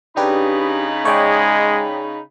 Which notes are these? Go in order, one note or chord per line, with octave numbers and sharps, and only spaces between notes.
C#3 D4 D#4 G4 B4 B5
G#3 C#5 D5 G5